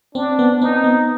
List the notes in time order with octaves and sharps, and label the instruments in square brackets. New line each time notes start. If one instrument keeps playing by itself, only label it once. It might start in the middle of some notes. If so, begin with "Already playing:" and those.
[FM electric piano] C4 [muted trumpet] D4
[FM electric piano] B3
[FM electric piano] C4 [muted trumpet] D#4
[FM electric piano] B3